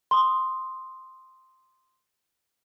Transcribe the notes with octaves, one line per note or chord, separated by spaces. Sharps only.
C6 D#6